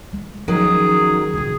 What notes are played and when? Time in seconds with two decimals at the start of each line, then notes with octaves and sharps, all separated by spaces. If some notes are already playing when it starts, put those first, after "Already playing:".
0.13 G#3
0.48 D#3 F3 F#3 C#4 G#4
1.33 A#1 C#3 G#4